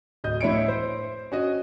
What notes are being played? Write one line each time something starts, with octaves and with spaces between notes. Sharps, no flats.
D1 D#5 G6
A2 E4 C#5 C#7 D7
C5
C#4 F#4 D#5